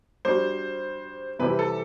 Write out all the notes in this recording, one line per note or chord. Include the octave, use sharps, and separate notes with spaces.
G3 D4 F#4 C5
C3 E3 G3 C4 G4 B4
A4